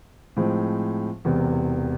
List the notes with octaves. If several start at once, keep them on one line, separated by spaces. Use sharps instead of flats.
A2 F3 G#3 C4
E1 E2 C3